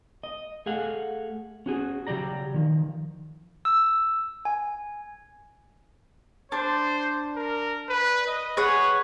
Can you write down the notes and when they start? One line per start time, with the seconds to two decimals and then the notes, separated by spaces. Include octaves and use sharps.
0.23 D#5
0.66 A3 G#4 F5 F#5
1.66 C#4 F#4 G#4
2.07 C#3 F#3 G4 D5 A#5
2.54 D#3 F3
3.65 E6
4.45 G#5
6.52 D4 C5
7.36 A#4
7.89 B4
8.27 D#5
8.57 G#4 B4 C#5 F#5